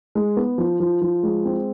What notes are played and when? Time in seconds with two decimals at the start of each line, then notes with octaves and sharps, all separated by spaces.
0.15 G#3
0.37 B3
0.58 F3
0.80 F3
1.02 F3
1.23 G#3
1.45 C4